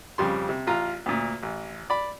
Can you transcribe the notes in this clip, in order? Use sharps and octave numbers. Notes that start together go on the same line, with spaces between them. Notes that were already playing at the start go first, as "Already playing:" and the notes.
F2 C#3 G3 C6
C3
A1 F4 A#5
D2 A#2
A1
D5 B5